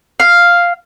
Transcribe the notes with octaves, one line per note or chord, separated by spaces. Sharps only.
F5